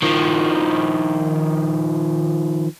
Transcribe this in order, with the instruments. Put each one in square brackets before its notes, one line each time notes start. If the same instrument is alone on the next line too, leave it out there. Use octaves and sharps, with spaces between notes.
[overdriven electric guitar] D#3 F3